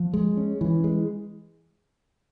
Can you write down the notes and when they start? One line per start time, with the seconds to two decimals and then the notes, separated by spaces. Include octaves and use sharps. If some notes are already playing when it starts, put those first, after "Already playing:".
Already playing: F3
0.14 G#3
0.37 C#4
0.61 E3
0.84 G#3